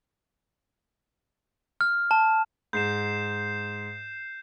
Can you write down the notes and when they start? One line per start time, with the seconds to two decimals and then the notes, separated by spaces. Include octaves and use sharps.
1.81 F6
2.11 A5
2.73 G#2 G6 C7 E7